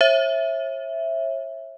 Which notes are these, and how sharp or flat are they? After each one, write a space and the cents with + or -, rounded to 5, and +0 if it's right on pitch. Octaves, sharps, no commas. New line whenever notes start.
C#5 -40 E5 +0